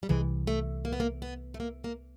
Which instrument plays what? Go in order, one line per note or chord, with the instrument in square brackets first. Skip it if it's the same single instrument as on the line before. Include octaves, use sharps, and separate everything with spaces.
[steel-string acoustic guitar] G3
[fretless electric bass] C2 C3 E3 [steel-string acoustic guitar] G#3
[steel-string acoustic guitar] A3
A#3
B3
A#3
B3
A3
A#3
A#3